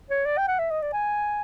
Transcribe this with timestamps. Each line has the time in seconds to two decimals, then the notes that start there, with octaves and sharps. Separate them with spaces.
0.10 C#5
0.26 D5
0.38 G5
0.48 F#5
0.59 E5
0.71 D#5
0.82 D5
0.93 G#5